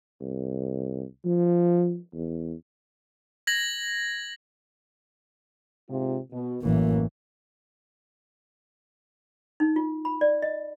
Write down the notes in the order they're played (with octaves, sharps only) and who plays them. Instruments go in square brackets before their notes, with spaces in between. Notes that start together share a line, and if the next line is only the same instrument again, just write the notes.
[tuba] C2
F3
E2
[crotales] G#6 A#6 F#7
[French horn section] G#2 C3 F4
B2
[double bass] A1 E3 [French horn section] F#2 A#3
[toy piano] D#4
F4
B5
D5
D#5